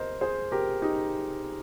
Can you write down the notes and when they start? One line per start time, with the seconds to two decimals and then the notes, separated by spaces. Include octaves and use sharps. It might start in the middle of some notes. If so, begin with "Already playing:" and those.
Already playing: C3 A#4 C5 D#5
0.21 G#4 C5
0.52 G4 A#4
0.82 D#4 G4